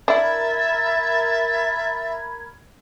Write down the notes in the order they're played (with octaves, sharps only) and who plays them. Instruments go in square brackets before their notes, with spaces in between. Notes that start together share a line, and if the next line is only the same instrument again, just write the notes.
[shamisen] D4 E4 [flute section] A#4 B5 G#6 [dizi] E5 [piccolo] A6